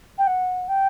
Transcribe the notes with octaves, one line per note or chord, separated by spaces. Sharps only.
G5
F#5
G5